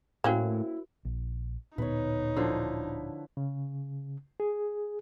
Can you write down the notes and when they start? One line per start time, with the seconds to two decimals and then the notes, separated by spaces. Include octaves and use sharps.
0.24 A2 A#3 C#4 E4 F#4 A#4 C5 G5
1.05 A#1
1.78 D1 A#2 B3 D#4 B4 C#5
2.37 D3 F3 E4
3.37 C#3
4.40 G#4